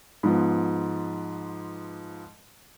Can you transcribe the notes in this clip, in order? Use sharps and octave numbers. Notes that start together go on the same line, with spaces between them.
G#2 F3 B3